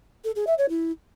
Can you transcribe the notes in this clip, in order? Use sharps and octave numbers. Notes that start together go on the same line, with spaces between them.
A4
G#4
E5
C#5
E4